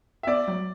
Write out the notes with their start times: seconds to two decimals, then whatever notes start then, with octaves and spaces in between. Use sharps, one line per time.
0.23 E5
0.27 B3 D5
0.48 F#3